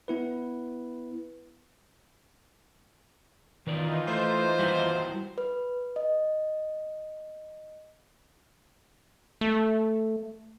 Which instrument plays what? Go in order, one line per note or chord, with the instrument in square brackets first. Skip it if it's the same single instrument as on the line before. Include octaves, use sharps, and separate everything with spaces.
[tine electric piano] B3 E4 B4
[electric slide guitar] D#3 B4 D5 [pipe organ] E3 D#4 F4
[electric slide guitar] A3 [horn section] C5
[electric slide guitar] G3 E4 F#4
[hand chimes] B4
D#5
[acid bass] A3